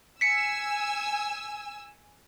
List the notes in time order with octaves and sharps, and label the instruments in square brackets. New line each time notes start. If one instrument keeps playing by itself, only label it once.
[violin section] G#5 E6 [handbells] B6 C#7